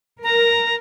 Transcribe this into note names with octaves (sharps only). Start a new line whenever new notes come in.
A#4 A#5